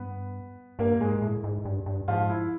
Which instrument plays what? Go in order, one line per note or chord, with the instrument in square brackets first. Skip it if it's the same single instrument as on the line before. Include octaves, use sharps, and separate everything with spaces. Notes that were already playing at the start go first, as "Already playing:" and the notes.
Already playing: [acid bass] G2 [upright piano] B3 B4
[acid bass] G2 [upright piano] A#3 A#4
[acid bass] G#2 [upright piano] G#3 G#4
[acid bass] A2
G#2
G2
G2
[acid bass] G#2 [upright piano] F3 F4
[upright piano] E4